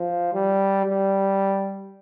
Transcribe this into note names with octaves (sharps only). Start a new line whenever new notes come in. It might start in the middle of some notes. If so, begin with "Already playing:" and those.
Already playing: F3
G3
G3